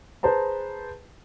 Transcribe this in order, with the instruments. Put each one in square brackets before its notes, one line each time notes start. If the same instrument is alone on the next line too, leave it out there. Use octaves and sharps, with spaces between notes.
[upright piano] G#4 B4 C5 A5 A#5